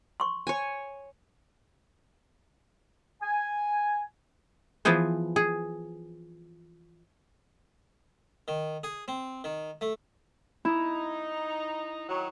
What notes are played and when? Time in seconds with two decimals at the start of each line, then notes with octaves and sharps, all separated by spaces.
0.20 C6 C#6
0.47 C#5 G#5
3.22 G#5
4.85 E3 F3 B3 G#4 C5
5.36 G#4
8.48 D#3
8.83 G#4
9.08 C4
9.44 D#3
9.81 A3
10.65 D#4 E4
12.08 D#3 F#3